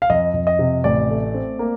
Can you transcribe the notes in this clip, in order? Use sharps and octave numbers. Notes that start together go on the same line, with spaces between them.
F5
F2 D#5
F2
D#5
C3
A1 D5
A3
C4
A#3